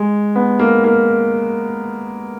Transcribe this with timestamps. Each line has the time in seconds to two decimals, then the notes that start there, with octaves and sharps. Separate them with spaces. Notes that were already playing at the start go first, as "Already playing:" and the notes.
Already playing: G#3
0.35 B3
0.59 A#3
0.84 A#3